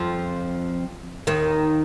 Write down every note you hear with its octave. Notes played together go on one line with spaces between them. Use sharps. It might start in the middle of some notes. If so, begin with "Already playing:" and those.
Already playing: F2 F3
D#2 D#3